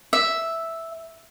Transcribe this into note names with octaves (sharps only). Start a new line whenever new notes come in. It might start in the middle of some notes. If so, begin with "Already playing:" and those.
E5